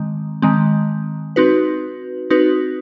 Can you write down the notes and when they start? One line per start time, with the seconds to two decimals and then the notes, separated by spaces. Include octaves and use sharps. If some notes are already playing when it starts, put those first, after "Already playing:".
Already playing: D#3 G#3 C4
0.42 D#3 G#3 C4
1.36 C4 D#4 F#4 B4
2.30 C4 D#4 F#4 B4